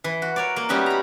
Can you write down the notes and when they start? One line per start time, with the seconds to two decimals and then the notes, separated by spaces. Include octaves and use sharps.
0.04 E3
0.22 F#4
0.36 A#4 C#5 D5
0.56 A#3
0.69 G3 B3 C#4 D#4 E4 F#4
0.86 A#5 B5